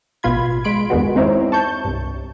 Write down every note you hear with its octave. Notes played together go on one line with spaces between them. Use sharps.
A1 B2 F4 B5 G#6
G#3 B5 C6 D7
E2 G2 D#3 G#3 B3 F#4
G#3 C4 D#4 E4 C5 C#5
A5 C#6 G6
C2 G2